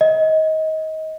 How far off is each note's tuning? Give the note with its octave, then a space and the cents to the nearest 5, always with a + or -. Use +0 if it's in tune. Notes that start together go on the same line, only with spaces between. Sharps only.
D#5 +25